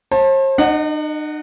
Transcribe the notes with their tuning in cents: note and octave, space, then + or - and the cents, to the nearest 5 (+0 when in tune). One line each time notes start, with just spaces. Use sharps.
C5 +45 A5 +0
D#4 -45 D#5 +0 F#5 +0